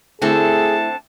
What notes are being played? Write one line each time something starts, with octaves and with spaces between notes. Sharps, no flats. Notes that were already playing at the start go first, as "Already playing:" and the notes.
D3 A3 C4 E4 G#4 A4 A5